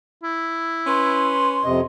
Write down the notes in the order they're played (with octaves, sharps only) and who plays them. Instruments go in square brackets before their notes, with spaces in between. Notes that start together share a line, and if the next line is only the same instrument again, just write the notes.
[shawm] E4
[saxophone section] C#4 B4 [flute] C6
[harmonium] F2 C3 D#5